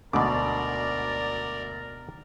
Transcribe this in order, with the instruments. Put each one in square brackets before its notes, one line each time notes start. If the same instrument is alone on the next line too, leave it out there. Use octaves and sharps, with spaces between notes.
[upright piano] D2 D3 D6 [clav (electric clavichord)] G#2 B2 [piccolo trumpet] A#4 [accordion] D5